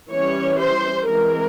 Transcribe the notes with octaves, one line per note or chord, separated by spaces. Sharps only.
E3 G3 C#4 C#5
C5
E3 G#3 C4 A#4